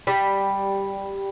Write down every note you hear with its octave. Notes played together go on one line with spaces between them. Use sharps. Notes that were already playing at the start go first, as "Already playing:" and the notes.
G3